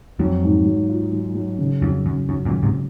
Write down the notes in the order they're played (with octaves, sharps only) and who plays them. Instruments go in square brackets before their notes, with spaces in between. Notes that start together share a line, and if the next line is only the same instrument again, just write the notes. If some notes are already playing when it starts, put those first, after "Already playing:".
[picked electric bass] F2 [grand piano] F#3
[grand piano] G#2
F#3
F4
F#3
F#3
C#3
[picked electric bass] F2 [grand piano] F#3
[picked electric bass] F#2 [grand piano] C#3
[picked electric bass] F#2 [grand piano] F#3
[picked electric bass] F#2 A#2
[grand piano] C#3
[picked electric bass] G#2 C3